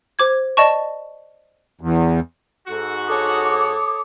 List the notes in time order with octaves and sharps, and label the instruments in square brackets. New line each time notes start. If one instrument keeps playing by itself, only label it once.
[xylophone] C5 D6 G#6
D5 D#5 A5 C#6
[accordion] E2
[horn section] G#2 F#4 [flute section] A4
[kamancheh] A4 C#5 [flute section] D6 D#6